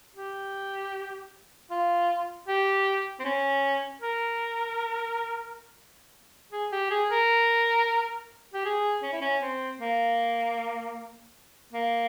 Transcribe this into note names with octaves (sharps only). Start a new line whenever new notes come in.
G4
F4
G4
C4
C#4
A#4
G#4
G4
G#4
A#4
G4
G#4
C#4
E4
C#4
C4
A#3
A#3